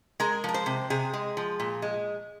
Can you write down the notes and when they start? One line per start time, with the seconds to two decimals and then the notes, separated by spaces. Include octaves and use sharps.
0.20 G#3 A#4
0.44 F3 A#4
0.54 C5
0.66 C3
0.90 C3 G#4
1.14 G#3
1.37 F3
1.60 A#2
1.82 G#3